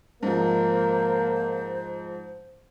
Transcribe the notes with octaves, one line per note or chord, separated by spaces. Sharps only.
G#2 F3 A#3 C5